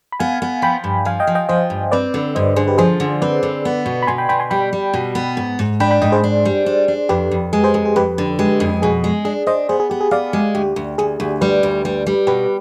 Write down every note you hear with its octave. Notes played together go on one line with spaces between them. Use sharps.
B5
B3 F5 G#5
B3
F3 G5 B5
G2
F3 F5 G#5
D#5 G5
F3
D#5 G5
F3 C5 D#5
G2
C4 B4 D5
D3
G2 C5 D#5
D3 G#4 C5
G4 B4
F3 G#4 C5
D3
C4 B4 D5
D3
B3
B2
B5
B2 G#5 C6
G5 B5
B2 G5 B5
G#5 C6
G3 G5 B5
G3
B2
B3
G#2
G#2
D4 G5 B5
G5 B5
G#2 D#5 G5
G#4 C5
D4
G3
D4
D4
F2 G4 B4
F2
G#3 G#4
G#4 C5
F2 G#4
G#4
F2 G4 B4
D3
G#3 G4 B4
F2
B2 G#4
G#3
D4 G#4
D4 C5 D#5
B3 G#4 C5
G#4
B3 G4
G#4
B3 D5 F5
G#3
D2 G4
D2
D2 G#4
D2
G3 G4 B4
D2
G3
G3
B2 G4 B4